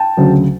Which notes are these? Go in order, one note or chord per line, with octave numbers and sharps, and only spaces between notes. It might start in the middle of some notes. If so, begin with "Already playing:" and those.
Already playing: G5 A5
D2 C#3 F#3